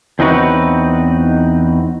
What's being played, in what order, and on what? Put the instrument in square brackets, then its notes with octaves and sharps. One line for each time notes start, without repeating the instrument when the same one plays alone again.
[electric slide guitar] E2 C4 D#4 F#4 B4 C#5